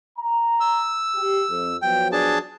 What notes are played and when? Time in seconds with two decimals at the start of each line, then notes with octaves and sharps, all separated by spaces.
0.18 A#5
0.60 E6
1.16 G4
1.50 F2
1.82 F3 F#3 B3 G5
2.12 D4 G#4 A5